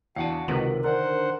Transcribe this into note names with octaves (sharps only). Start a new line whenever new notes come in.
E2 D4 F#4 F5 F#5 A5
C#2 C3 D#3 F4 A#4 B4 F#7
D3 D4 A#4 C5 F#5